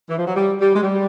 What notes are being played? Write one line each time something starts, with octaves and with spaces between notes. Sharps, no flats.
E3
F3
F#3
G3
G3
G#3
G3